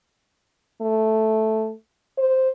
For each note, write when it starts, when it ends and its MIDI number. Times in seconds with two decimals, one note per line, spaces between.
0.81 1.72 57
2.18 2.50 72